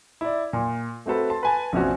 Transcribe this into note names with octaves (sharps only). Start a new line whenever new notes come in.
E4 D5
A#2
A3 C4 F#4 A4 B4
A5 C6
B4 G#5 A5
A#1 C3 F3 C#4 F#4